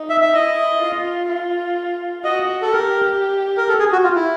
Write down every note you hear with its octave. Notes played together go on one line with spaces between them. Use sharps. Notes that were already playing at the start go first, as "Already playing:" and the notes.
Already playing: D#4
E5
E5
E4 D#5
F4
F4
F#4 D#5
A4
G4 A#4
A#4
A4
G#4
F#4
F4
E4